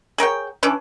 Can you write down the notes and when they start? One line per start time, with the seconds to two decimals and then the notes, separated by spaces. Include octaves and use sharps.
0.18 G#4 A#4 C#5 G5
0.63 E3 C#4 D4